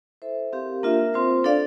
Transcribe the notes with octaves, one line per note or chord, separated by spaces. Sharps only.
E4 A4 C5 E5
C4 G4 A#4 F5
A#3 D4 F4 A#4 E5
C4 F4 C5
D4 A4 D5 F5